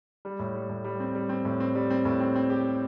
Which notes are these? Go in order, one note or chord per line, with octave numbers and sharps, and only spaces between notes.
G3
A2
G3
A2
G3
C4
G3
C4
A2
C4
G3
C4
A2
C4
C4
G4